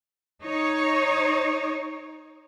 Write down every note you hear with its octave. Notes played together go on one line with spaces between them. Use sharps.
D#4 C#5